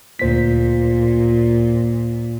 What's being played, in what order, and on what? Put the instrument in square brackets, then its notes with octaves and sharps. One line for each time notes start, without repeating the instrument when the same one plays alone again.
[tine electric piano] D2 C5 B6 [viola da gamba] A#2